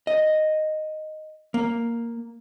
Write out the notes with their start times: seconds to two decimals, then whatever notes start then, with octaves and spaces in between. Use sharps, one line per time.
0.07 D#5
1.54 A#3